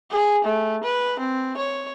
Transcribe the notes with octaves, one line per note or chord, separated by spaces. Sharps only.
G#4
A3
B4
C4
C#5